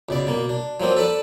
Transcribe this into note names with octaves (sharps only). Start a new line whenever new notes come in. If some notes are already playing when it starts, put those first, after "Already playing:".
C#2 B2 D5
B2 A#3
D4
F3 F#3 A#3 C4 D4
A4 B4 D5 A5